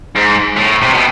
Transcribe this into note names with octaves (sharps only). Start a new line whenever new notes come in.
G#2
A2
C3
B2